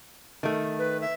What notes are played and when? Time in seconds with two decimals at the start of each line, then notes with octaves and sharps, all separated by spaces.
0.43 D#3 A3
0.79 B4
1.01 E5